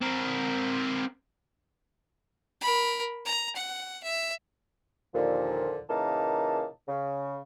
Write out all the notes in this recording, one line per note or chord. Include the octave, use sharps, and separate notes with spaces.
C4 A#4
A#4 B5
A#5
F#5
E5
D#2 A#2 D3 F3
A#2 C#3 E3 A#3 D#4 A5
C#3